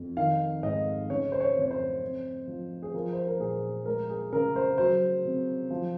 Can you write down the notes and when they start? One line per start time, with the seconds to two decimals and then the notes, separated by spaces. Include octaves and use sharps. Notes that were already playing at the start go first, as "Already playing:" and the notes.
Already playing: F2
0.17 D#3 F5
0.63 G#2 D#5
1.10 C#3 C#5
1.32 C5
1.40 C#5
1.56 F2
1.62 C#5
1.71 C5
2.02 C4
2.47 F3
2.83 G#4
2.94 F3 A#4
3.13 C5
3.27 A#4
3.39 A#2 G#4
3.86 G#3 A#4
4.09 G#4
4.33 C#3 A#4
4.56 C5
4.78 F#3 C5
5.25 C3
5.70 F3